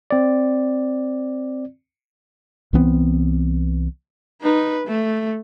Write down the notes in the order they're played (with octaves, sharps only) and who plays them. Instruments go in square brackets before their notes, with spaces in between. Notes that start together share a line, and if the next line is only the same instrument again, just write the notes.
[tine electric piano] C4 D5
[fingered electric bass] C2 E3 B3 C4
[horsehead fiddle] D#4 B4
A3